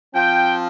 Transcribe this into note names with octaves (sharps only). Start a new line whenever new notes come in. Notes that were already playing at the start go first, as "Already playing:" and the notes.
F3 C4 F4 G5